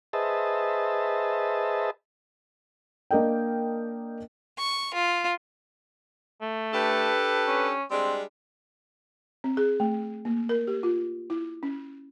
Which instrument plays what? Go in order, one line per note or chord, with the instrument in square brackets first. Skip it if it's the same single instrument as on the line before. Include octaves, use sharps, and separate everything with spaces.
[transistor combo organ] G#4 B4 C5 D#5 E5 A5
[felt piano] A#3 D4 A#4 D#5 G5
[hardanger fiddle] C#6
F4
[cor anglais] A3
[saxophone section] D4 G4 A4 [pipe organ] B4
[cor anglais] C#4
[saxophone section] G3 G#3 D4 [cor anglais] C4
[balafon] C4
G#4
A3
A#3
A#4
G4
F4
E4
C#4